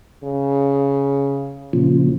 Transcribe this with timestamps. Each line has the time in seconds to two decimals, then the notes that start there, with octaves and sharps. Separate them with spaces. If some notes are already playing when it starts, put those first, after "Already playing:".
0.24 C#3
1.73 A#2 C#3 F3